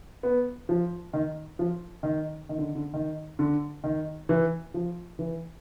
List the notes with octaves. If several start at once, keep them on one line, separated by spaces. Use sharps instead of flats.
B3
F3
D#3
F3
D#3
D#3
D3
D3
D#3
D3
D#3
E3
F3
E3